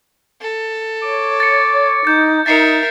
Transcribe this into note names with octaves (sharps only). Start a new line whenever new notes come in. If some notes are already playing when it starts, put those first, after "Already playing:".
A4
C#5 D6
A6 C#7
D#4 G6 A6
D#4 A#4 E5 A6 C7 C#7